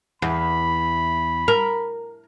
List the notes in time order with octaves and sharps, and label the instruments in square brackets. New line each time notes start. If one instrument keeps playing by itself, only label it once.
[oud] E2 [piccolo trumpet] B5
[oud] A#4